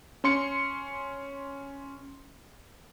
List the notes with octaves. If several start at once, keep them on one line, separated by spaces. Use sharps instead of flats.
C#4 C6 C#7